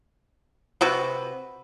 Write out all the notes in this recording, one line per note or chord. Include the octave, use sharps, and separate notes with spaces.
C3 F#4 B4